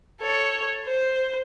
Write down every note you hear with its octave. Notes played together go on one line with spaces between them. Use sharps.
A4 C#5
C5